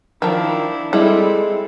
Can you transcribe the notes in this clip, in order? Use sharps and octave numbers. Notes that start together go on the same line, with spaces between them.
D#3 F3 D4 E4
G3 G#3 C4 E4 A4